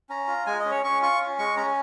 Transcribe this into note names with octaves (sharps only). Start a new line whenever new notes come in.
C#4 A#5
F4
G#3 G#5
D#5
C#4
C#5
C#4 C#6
F4 C#6
C#4
G#3 C#6
C#4 A#5